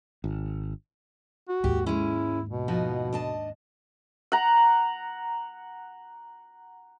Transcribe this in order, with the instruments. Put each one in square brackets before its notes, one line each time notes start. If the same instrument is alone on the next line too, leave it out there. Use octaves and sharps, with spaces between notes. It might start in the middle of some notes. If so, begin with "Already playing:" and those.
[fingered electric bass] G#1
[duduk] F#4
[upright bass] D#2 G#2 [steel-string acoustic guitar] G4
[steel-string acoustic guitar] G#3 C#4 [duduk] E4
[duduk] B2
[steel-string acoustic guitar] F3 D#4 F#4
D4 D#5 A5
[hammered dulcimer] F#5 A#5